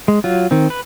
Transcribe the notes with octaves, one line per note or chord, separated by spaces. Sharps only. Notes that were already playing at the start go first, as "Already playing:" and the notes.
G#3
F#3 F4
D#3 C4
B4